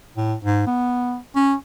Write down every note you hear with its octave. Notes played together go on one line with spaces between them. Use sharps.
A2
G#2
B3
C#4